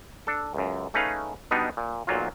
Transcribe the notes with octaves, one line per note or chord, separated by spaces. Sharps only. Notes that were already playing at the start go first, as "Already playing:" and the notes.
D4 A4
C#2 F#2
A3 C#4 D#4 G#4 B4 F5
B2 G3 B3 D4 D#4
A#2
B1 A#2 F#3 F4